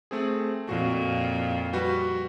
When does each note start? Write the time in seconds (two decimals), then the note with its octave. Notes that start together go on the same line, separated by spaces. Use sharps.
0.11 A3 C4 G#4
0.69 F2 A#2 F#4
1.73 G3 F#4 B4